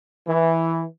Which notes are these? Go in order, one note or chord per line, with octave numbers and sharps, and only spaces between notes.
E3